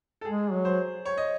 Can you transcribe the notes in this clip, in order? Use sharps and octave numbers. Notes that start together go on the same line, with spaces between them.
A4
G#3 G#4
F#3
C5
C#5
D#5